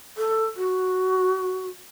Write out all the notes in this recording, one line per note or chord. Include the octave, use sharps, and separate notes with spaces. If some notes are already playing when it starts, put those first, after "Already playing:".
A4
F#4